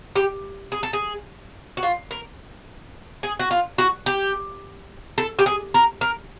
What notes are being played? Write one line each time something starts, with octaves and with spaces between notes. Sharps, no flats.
G4
G#4
A4
G#4
F#4
F4
A#4
G#4
F#4
F4
F#4
G4
A4
G4
G#4
A#4
A#4